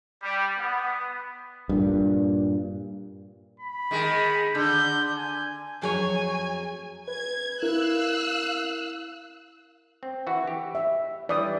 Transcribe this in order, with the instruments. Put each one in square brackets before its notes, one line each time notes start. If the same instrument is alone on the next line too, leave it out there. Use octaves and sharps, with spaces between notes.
[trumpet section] G3
B3
[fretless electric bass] G2 A#2
[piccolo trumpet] B5
[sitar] D#3 G#3
[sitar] D3 [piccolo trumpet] G6
[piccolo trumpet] G#5
[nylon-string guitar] F2 F#3 [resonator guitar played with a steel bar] A3 G#4 C#5 [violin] G#5
[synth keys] B4 [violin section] G#6
[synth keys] E4 A#4 [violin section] F5 E6 F#6
[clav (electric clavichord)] C4
E3 F#4
G4
[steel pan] E5
[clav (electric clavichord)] E3 G3 A3 [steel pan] D5 D#6